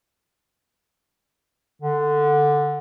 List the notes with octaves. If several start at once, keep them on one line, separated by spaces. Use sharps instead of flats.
D3